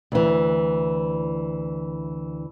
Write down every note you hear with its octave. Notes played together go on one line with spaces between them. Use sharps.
D2 E3